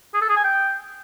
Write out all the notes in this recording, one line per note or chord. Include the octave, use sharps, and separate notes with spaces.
G#4
A4
G#4
G#5
G5